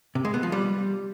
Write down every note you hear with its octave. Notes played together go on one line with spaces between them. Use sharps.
C3
G#3
B3
F3
G3